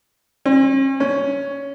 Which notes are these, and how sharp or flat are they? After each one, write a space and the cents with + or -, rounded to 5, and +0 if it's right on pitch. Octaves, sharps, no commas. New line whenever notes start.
C#4 -40
C#4 +10